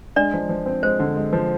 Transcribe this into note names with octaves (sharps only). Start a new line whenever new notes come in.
G#3 D4 D5
F3
F3
C4
G#3 C5
D3
G#3
F3